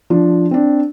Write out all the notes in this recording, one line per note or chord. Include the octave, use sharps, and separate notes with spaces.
F3 D4
C4 D4